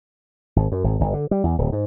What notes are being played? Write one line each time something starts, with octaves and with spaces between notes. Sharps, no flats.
G#1
F#2
G#1
G1
D3
G3
E2
D1
G#2